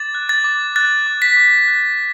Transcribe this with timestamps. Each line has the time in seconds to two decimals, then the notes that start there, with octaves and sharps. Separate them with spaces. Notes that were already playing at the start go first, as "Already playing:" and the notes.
Already playing: D6 A6
0.15 F#6
0.29 A6
0.44 D6
0.76 F#6 A6
1.06 D6
1.22 B6
1.37 D6
1.68 F#6